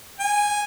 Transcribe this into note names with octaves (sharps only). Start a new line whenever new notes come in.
G#5